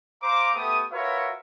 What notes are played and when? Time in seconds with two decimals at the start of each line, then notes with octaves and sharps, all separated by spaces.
0.22 C5 F5 A#5 D6
0.55 A3 B3 G4 D#6
0.92 F4 F#4 A#4 B4 C#5 E5